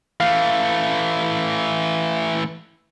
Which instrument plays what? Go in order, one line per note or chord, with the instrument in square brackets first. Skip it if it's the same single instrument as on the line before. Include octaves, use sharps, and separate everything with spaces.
[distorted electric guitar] E3 A3 [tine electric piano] F5